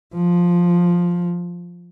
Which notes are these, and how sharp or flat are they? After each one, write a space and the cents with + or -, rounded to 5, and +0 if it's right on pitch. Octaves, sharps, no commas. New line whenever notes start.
F3 +5